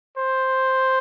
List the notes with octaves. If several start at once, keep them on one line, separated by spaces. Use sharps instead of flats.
C5